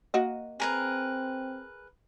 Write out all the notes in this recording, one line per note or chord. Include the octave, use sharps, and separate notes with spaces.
A#3 F#4 D#5
C4 G#4 A#4 B4